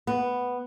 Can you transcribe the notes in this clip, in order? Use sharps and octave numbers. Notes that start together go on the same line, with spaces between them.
B3